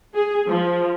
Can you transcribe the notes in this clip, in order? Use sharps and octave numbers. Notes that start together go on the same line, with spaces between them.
G#4
F3